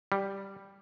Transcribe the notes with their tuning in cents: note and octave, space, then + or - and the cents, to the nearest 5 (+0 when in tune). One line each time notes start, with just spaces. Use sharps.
G3 +0